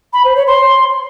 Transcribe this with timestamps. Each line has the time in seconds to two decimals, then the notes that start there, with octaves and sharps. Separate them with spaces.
0.13 B5
0.24 C5
0.35 C#5
0.46 C6